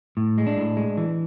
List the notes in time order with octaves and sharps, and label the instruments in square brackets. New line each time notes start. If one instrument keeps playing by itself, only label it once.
[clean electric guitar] A2
G#3
D4
A2
G#3
E3